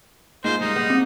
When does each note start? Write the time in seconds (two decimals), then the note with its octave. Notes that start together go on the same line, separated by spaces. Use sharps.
0.44 G#2 A#3 D#4 F4 C5
0.61 G3 A#3 D#4
0.76 B3 F5
0.90 C4